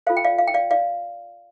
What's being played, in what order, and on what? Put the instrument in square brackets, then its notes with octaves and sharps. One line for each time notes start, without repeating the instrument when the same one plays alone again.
[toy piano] F4 A4 C5 F5
G5
D5 F5
F5
G5
D5 F5
D5 F5